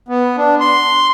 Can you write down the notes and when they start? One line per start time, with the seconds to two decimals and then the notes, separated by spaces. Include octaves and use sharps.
0.08 B3
0.37 D4
0.60 C6